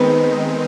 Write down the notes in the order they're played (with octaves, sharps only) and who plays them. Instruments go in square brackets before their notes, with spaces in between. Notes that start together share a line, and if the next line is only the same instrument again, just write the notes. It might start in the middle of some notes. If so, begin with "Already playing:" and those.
Already playing: [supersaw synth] D#3 G#3 C4 D#4 [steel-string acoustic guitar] B3